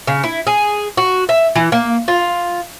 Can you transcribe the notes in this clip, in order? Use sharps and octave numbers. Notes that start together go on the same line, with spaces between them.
C#3
E4
G#4
F#4
E5
E3
A#3
F4